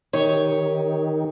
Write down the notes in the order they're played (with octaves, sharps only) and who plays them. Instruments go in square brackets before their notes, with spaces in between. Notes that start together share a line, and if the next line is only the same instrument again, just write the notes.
[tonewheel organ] D#3 [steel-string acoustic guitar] D#4 G4 [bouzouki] C#5